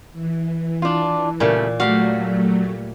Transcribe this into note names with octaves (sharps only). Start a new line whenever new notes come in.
E3
D4 F4
A#2 C#3 G3 A3
F#3 G3 A3 F#4 F5